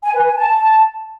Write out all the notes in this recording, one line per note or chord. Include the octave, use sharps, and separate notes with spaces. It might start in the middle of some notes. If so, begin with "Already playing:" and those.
G#5
B4
G#5
A5